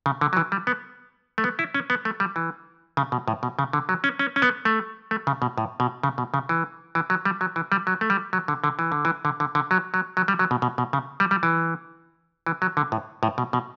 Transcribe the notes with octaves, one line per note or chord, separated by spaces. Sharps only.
C#3
D3
F#3
E3
G3
B3
A3
B3
E4
C#4
B3
A3
G3
E3
C#3
B2
A2
B2
C#3
D3
F#3
C#4
C#4
C#4
B3
A3
A3
C#3
B2
A2
B2
C#3
B2
C#3
E3
E3
F#3
G3
F#3
E3
G3
F#3
A3
G3
F#3
D3
D3
E3
D3
E3
D3
D3
D3
F#3
F#3
F#3
G3
F#3
B2
B2
B2
C#3
G3
G3
E3
E3
F#3
D3
A2
A2
B2
B2